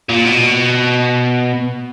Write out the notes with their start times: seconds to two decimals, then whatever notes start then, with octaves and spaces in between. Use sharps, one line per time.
0.09 A#2
0.25 B2